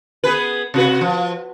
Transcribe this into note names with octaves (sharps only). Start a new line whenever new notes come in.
B3 G#4 B4
C3 F#4 B4
F3